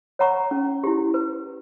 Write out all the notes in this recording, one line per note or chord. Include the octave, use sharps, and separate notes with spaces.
C#5 F#5 A#5 C#6
C#4
E4 G4
B4